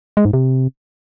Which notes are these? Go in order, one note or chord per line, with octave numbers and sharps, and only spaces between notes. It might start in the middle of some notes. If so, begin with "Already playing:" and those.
G#3
G#2
C3